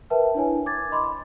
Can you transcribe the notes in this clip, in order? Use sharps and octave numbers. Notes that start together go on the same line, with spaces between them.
A#4 B4 E5 G5 A5
D4 E4 C#5 G#5
D6 G#6 A6
D#5 B5 C6 D6
B5